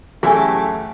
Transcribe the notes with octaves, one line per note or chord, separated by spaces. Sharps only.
F#2 E3 A3 G4 G#4 G#5